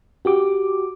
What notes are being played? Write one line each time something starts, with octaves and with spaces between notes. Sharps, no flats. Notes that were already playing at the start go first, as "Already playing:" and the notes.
F#4 G4 D6